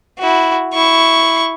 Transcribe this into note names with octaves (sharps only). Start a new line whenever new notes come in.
E4 F#4
E4 C#6